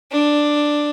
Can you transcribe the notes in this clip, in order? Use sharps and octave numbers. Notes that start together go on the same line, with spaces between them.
D4